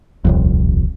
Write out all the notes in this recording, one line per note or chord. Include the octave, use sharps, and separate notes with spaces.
D#1 C2 F2